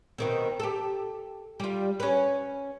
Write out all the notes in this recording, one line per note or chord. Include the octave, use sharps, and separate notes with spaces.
B2 D#3 C4
G4 A4
G3 F4
C#4 B4